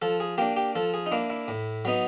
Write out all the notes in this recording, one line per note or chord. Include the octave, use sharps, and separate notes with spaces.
F3 A4
G#4
A#3 D4 G4
G4
F3 A4
G#4
D#4
A#3 D4 E4
E4
A2
F#3 B3 D#4